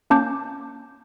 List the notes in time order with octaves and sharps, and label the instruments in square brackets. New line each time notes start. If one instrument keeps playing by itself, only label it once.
[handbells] A#3 C#4 A5 D6 G6